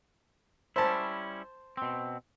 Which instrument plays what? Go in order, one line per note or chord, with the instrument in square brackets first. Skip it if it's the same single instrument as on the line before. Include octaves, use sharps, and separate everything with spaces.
[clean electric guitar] G3 C#4 E4 [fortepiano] C5 A5
[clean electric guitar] B2 C4